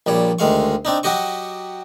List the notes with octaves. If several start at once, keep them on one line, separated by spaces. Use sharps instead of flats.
A#1 A#2 G3 C#5
D2 D#3 G#3 F5 C#6
C4 D4 D#4
F#3 F#4 G4 D#5 C#6